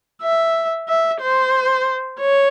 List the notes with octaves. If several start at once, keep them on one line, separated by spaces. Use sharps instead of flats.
E5
E5
C5
C#5